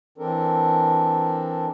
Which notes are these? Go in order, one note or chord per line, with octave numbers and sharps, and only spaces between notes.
E3 C4 D4 A4 A#4